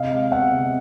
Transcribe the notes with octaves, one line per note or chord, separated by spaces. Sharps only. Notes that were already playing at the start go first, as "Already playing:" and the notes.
Already playing: C3 D#5 F5
G#3
B3 E5 F#5
C3